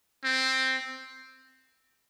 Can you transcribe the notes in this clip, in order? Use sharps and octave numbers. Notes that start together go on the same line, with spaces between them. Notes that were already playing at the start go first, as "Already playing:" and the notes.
C4